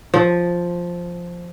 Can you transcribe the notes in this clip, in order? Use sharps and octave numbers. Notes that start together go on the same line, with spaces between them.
F3